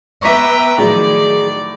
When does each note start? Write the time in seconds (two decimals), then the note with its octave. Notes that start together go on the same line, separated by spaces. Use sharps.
0.22 B3 B4 E5 G5 A#5 C#6 D6 B6
0.78 A2 D#3 F3 F#3 G#4 D5